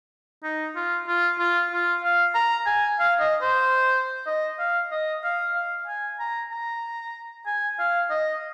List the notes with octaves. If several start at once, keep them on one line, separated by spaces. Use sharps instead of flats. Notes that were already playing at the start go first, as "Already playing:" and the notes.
D#4
F4
F4
F4
F4
F5
A#5
G#5
F5
D#5
C5
D#5
F5
D#5
F5
F5
G#5
A#5
A#5
G#5
F5
D#5